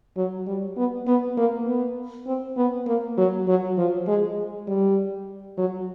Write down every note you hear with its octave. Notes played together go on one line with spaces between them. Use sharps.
F#3
G3
B3
B3
A#3
B3
C4
B3
A#3
F#3
F#3
F3
G#3
G3
F#3